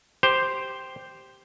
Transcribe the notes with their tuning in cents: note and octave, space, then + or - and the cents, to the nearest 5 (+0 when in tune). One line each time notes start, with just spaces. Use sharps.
G4 +0 C5 +0